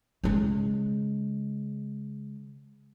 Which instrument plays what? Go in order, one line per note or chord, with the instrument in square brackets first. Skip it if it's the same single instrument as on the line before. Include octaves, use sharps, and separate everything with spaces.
[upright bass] C#3 G#3